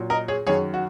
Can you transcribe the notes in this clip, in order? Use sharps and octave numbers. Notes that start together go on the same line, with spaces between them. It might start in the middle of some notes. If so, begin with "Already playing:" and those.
Already playing: A#2 F#3
A#4 D#5
G#4 C#5
F#2 D#3 F#3 G#4 C#5
F#4